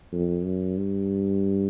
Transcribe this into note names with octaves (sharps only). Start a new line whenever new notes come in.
F2
F#2
G2